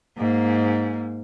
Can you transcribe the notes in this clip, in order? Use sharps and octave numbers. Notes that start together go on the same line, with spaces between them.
G#2 A#3